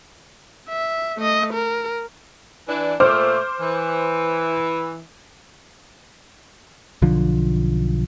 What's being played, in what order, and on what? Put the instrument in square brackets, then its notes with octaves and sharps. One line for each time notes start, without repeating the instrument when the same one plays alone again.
[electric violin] E5
A3 D#5
A#4
[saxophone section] E3 D4
[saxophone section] A#2 A3 [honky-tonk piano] C5 D6 F6
[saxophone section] E3
[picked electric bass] B1 D3 F3